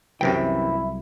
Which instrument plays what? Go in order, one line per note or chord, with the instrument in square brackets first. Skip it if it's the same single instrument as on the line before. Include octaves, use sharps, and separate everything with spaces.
[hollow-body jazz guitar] C2 F#3 G5 [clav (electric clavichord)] F#2 C3 E3 [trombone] E4